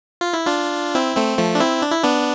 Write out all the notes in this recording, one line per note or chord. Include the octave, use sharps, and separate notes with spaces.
F4
E4
D4 F4
C4 E4
A3 C4
F3 A3
D4
C4 E4
D4
E4
B3 D4